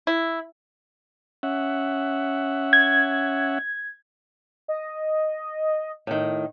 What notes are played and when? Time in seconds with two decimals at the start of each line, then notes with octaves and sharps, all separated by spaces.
0.07 E4
1.43 C#4 E5 F#5
2.73 G#6
4.68 D#5
6.07 A2 D#3